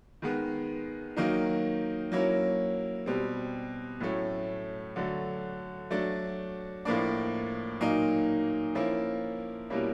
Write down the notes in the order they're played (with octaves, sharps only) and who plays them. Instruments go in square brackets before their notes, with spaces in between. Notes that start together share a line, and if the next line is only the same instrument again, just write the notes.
[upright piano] D#3 G#3 B3
D#3 F#3 A#3 D#4
F#3 A#3 C#4 E4
B2 G3 C4
A2 F#3 A3 C#4
D3 F#3 A3
F#3 A3 D4
A2 F3 A#3 D4
A#2 F#3 A#3 D#4
F3 A#3 C#4 E4
B2 G3 A#3 C#4 E4